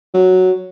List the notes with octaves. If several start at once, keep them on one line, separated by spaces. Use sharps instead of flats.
F#3